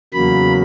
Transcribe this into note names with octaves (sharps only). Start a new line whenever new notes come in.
E2 C#3 F#3 A#3 B5